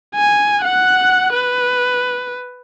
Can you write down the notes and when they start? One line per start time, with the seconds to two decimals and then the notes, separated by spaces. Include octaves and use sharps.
0.15 G#5
0.63 F#5 F#6
1.33 B4